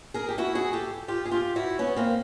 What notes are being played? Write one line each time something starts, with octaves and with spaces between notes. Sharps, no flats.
G#4 A#4
G4
E4 F#4
F#4 G#4
G4 A4
F4 G4
G#4
F4 G4
E4 F#4
B3 C#4
A#3 C4